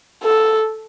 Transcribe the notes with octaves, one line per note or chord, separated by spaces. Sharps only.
A4